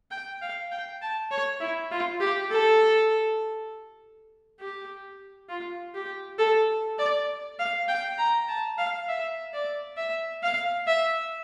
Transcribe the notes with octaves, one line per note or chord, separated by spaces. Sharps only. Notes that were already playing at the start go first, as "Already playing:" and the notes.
G5
F5
G5
A5
C#5
E4
F4
G4
A4
G4
F4
G4
A4
D5
F5
G5
A#5
A5
F5
E5
D5
E5
F5
E5